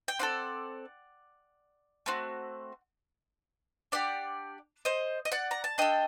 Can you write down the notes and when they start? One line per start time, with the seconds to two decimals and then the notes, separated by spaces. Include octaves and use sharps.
0.08 G5
0.19 C4 F#4 A4 D5 F#5
2.06 A3 C4 F#4
3.92 D4 G4 D5 F#5
4.85 C5 D#5
5.25 D#5
5.32 D5 F#5
5.51 A#5
5.64 A5
5.78 D4 A4 D#5 G5